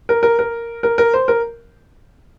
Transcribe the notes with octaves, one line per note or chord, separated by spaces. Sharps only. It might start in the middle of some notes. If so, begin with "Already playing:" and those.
A#4
A#4
A#4
A#4
A#4
C5
A#4